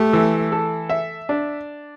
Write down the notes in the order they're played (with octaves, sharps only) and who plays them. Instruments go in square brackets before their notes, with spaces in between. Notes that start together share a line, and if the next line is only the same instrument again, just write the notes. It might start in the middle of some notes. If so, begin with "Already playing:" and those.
Already playing: [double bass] A3 [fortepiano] G4
[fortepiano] E3
A4
E5
D4